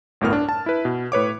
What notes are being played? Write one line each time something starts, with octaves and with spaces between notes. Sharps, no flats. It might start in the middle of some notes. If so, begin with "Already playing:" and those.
G1 D2 A2 B3 A#4 F6
D4
A5
E4 B4
B2
A2 B4 C#5 D6